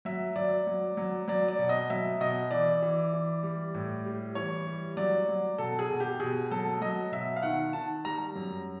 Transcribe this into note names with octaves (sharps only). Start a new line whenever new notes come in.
F#3 E5
F#3 D5
F#3
F#3
F#3 D5
D5
B2
D#5
F#3 E5
B2 D#5
E3 D5
E3
E3
G3
A2
G3
E3 C#5
G3
F#3 D5
F#3
B2 A4
G#4
B2
G4
B2 G#4
F#3 A4
F#3 D#5
B2 E5
F5
D#3 F#5
D#3 A5
G3 A#5
F#2